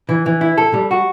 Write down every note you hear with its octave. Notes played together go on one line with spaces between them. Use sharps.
E3
E3
E4
A4
G3
F#4